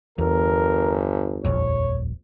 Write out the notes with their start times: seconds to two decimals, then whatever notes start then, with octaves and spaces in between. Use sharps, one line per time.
0.18 G1 E2 A#4
1.45 D#1 A#1 F2 C#5